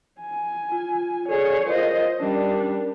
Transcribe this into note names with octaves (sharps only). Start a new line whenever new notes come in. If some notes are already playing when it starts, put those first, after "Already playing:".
G#5
F4
G#4 A4 C#5 D5
F4 A#4 C5 D#5 F5
G3 C#4 D4 A#4